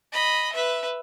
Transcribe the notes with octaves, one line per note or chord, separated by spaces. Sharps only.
D#5 B5
B4 E5